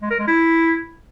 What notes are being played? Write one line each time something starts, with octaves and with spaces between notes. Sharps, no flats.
G#3
A#4
G#3
E4